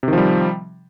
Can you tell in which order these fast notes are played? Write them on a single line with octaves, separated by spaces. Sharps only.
C3 D#3 F3 G3